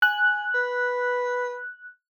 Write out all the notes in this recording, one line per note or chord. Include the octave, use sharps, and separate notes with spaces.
G#5 F#6
B4